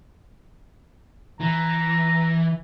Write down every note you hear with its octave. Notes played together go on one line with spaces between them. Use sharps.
E3 A#5